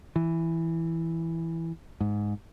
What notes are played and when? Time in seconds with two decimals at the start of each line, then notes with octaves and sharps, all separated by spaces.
0.16 E3
2.00 G#2